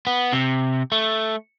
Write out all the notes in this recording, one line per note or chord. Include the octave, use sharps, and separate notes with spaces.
B3
C3
A3